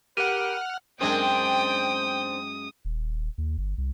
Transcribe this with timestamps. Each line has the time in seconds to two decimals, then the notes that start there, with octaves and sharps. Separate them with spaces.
0.17 G4 A#4 B4 F#5 F6 D#7
1.01 F#2 G#3 C4 D4 G5 G#5 D#6
2.85 D#1
3.38 D#2
3.58 G1
3.78 C2